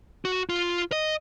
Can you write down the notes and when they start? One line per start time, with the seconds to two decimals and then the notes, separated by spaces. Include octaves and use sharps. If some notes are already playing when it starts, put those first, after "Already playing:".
0.25 F#4
0.49 F4
0.92 D#5